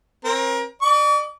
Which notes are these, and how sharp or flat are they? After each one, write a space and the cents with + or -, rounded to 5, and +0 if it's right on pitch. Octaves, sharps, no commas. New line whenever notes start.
C4 +35 A#4 +25
D5 +35 D6 -45